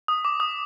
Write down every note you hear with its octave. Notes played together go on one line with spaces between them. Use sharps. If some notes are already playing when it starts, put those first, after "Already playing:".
D#6
D6
D#6